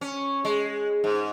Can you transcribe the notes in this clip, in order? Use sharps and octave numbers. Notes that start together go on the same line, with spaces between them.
C#4
G#3
G#2